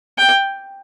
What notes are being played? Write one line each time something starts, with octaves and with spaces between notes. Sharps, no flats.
G5